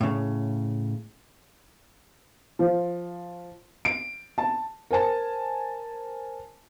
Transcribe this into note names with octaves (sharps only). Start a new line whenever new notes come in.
A2 C#3
F3
D7
A5
A#4 C5 G#5 A5